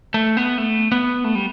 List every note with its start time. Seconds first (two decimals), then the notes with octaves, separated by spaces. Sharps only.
0.14 A3
0.37 B3
0.58 A3
0.92 B3
1.24 A3
1.35 G3